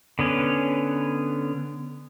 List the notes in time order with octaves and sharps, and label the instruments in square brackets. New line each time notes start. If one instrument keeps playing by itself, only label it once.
[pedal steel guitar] D3 B3 C#4